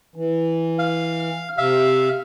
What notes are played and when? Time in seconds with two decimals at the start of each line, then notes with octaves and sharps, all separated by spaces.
0.16 E3
0.79 F5
1.58 C3 E5 F5